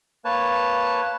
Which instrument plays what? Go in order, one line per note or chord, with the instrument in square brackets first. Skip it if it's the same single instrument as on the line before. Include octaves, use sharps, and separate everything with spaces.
[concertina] A#3 B4 C#5 A5